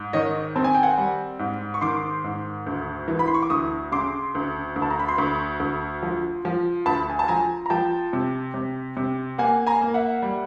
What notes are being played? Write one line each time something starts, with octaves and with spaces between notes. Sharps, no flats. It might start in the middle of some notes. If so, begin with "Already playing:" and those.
Already playing: G#2
D#3 C#5 D#5
C4 A5
G#5
G5
F#5 G#5
G3
G#2
C#6
D#3 C6 D6
G#2
D2
E3
B5
C6
C#6
D6
D2 C#6 D#6
C#3 C6 D6
D2
D2
A5
A#5
B5
C6
D2 B5 C#6
D2
F3
F3
D2 A5 B5
G#5
A5
F3 G#5 A#5
A#5
F3 G5 A5
C3
C3
C3
A#3 F#5 G#5
G#5 A#5
A#3
E5 F#5
G3